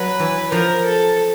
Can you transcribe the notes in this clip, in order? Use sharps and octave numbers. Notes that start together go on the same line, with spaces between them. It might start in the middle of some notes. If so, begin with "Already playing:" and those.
Already playing: F#3 B4
E3
F3 A#4
A4